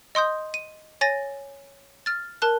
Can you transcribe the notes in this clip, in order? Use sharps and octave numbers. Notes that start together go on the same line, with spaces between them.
D#5 C6 D#6 G6
D#7
C#5 G#5 A6 A#6
F6 A6
A#4 A5 F#6